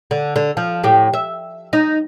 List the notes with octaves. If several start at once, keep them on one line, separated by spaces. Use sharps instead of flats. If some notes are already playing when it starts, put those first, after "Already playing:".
D3
D3
F3
A2 G4
E5
D#4